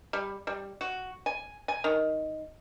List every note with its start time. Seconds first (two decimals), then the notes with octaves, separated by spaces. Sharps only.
0.13 G3
0.47 G3
0.81 F#4
1.26 G#5
1.68 G#5
1.84 D#3